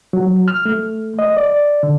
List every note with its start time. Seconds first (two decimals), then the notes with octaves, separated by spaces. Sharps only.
0.13 F#3
0.48 F6
0.65 A3
1.19 D#5
1.37 D5
1.83 D3